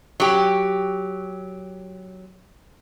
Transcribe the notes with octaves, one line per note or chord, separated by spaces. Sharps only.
F#3 G4